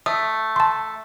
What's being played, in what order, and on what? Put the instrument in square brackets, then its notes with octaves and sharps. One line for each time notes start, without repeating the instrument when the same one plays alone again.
[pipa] A3 [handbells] D#6
[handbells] A5 C6